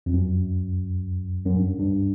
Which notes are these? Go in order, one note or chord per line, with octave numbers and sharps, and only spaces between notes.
F2
F#2
F#2
G2
G2